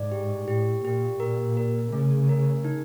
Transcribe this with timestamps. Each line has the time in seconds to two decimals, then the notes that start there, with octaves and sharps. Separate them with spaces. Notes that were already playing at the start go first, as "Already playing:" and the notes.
Already playing: G#2 D5
0.12 G4
0.48 A2 G4
0.84 A#2 G4
1.20 A#2 A#4
1.57 A#4
1.93 C#3 A3
2.29 A#4
2.64 D#4